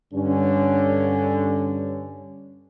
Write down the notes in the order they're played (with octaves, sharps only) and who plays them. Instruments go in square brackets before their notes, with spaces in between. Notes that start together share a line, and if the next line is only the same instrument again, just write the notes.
[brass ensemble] G2 D3 C#4